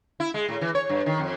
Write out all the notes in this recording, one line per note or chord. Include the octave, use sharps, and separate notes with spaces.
E4
G#3
A2
E3
C#5
G2
D#3
F2